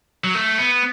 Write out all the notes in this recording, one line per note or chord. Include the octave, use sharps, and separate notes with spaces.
F#3
A3
B3